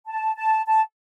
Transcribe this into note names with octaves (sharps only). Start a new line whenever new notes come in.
A5
A5
A5